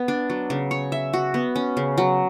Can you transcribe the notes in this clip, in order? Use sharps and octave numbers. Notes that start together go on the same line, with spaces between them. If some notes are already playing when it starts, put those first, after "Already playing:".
Already playing: B3
D4
F#3
C#3
C#5
E5
F#4
B3
C#4
C#3
F#3